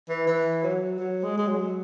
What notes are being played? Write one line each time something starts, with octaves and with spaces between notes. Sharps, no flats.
E3
E3
F#3
F#3
G#3
G#3
F#3